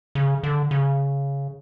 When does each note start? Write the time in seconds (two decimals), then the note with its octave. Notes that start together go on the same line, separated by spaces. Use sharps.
0.15 C#3
0.43 D3
0.71 C#3